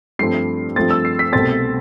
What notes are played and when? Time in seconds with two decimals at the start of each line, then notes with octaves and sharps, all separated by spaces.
0.19 G2 F3 A3 C4 C7
0.76 G2 F3 A3 C4 A6
0.91 E6
1.05 C7
1.19 B6
1.33 C2 B2 A3 C4 A6